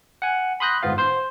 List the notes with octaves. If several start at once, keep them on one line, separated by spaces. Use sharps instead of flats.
F#5 G#5
B5 C6 D#6 F#6 G6 A#6
G1 G#2 B3 F4 F5
C5 C6 G6